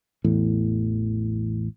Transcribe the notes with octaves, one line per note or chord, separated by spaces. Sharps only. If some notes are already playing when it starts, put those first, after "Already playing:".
A1 E2 A2